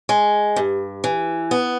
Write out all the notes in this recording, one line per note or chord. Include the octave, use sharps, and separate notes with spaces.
G#3
G2
E3
B3